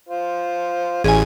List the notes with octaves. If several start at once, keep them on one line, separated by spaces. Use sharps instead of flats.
F4 C5
A1 E3 C#4 G#4 G#5